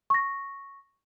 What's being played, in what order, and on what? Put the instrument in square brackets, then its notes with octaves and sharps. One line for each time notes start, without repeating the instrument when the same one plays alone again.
[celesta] C#6 A#6